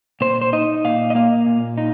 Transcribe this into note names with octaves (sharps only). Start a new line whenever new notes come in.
A#2 C5
C5
D#4 D#5
A#2 F5
D#5
A#3 F5
A#2
D#4